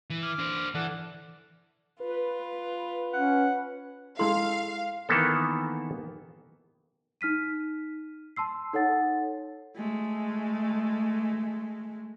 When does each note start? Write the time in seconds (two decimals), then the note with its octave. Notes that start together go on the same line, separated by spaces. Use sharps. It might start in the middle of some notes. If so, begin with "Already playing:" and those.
0.10 E3
0.23 D6 F6
0.39 D4 C5
0.75 E3 A4 D5 F#5
2.00 F4 B4
3.14 C#4 F#5
4.19 G#3 E4 A4 F5 C6
5.09 D#3 E3 A#3 B3 A4
7.21 D#4 F6 B6 D#7
8.36 A5 C6 E6 C7
8.73 D#4 A4 C#5 F#5 A6
9.76 G#3 A3